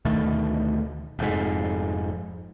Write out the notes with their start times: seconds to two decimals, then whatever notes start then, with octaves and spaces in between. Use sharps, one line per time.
0.05 D2 B2 D#3 A3
1.19 F1 F2 G#2